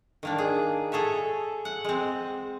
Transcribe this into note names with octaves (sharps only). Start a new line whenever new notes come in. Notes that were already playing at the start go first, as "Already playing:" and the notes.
D#3 A#3 D4
G#4
G#4 A4 C#5 E5
F#5
G#3 C4